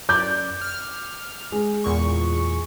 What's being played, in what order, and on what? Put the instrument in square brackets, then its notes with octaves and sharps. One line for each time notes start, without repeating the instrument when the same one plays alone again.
[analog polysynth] F#2 D5 [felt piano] D6 G6
[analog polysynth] F6
[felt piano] G#3
[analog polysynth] E2 A#2 C#6